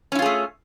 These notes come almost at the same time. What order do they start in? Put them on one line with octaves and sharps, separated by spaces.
C#4 E4 F4 G#4 A3